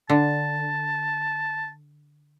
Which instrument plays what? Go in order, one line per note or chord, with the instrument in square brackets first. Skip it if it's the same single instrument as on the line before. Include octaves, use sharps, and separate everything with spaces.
[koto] D3 [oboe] A5